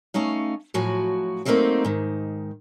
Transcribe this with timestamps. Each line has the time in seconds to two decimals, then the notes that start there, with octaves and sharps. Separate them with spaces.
0.14 A3 C#4 D#4 F5
0.74 A2 F3 F#3 F#4 G#5
1.45 F#3 G3 A3 A#3 C4 D#4
1.84 G#2 D#3